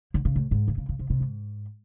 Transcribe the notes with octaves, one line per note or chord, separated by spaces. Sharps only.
D3
C#3
A2
G#2
C#3
C#3
C#3
C3
C3
G#2